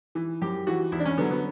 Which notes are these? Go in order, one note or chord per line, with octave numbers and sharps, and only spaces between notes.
E3
F#2 G4
E3 F#4
E2 E4
D4
C#4
D3 F#3 B3
B3